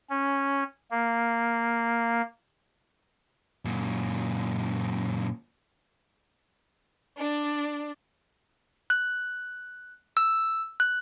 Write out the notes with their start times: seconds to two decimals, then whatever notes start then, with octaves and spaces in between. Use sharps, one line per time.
0.10 C#4
0.91 A#3
3.65 F#2 A#2
7.17 D4 D5
8.90 F#6
10.17 E6
10.80 F#6